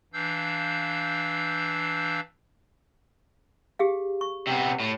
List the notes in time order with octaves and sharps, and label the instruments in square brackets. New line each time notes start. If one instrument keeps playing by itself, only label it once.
[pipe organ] E3 D4 F5 E6 G6
[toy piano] G4 G#4 F5
C#6
[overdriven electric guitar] C3 B3
A2